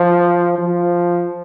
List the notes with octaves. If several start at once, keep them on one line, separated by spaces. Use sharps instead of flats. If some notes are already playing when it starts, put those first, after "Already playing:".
Already playing: F3
F3